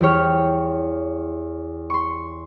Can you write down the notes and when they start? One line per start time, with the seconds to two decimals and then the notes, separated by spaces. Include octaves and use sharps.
0.01 E2 E4 G4 C#5 F6
1.90 C6 C#6